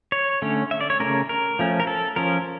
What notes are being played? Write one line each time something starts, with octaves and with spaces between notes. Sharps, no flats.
C#5
D3 A3 C#4
E5
D5
C#5
C#3 F3 A3 C#4 A#4
A#4
F3 A3 C#4
A#4
A4
F3 C#4 A#4